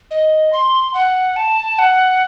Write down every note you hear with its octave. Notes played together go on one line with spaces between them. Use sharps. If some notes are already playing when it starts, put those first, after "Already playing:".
D#5
C6
F#5
A5
F#5